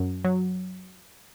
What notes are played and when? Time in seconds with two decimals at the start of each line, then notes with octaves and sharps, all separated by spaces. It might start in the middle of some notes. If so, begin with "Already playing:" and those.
Already playing: F#2
0.25 F#3